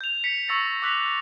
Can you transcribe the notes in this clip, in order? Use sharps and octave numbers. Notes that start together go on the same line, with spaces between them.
G6 F7
B6 C#7
C#6 E6 A6 A#6 C#7
D6 E6 F#6 B6 F7